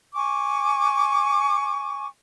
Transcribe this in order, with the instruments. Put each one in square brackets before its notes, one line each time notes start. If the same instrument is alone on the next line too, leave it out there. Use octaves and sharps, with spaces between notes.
[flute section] G#5 C#6 D6